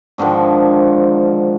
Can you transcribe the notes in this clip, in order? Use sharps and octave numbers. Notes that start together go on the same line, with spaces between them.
G#2 D3 D#3 F3